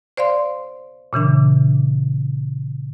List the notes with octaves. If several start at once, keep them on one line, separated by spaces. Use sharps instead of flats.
C5 D5 F5 C6
A#2 C#3 E3 D4